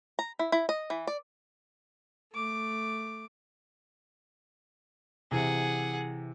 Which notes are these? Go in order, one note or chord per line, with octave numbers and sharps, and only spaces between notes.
A#5
E4
E4
D#5
E3
D5
A3 D6
C3 E3 G#4 F#5